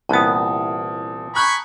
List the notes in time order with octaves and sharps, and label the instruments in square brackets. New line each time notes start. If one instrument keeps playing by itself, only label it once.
[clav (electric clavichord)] C2 B3 [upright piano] A#2 E3 [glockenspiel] A5 D#6
[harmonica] G#5 B5 C#6 [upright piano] A#5 F#6 G6